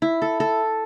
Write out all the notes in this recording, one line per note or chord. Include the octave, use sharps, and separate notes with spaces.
E4
A4
A4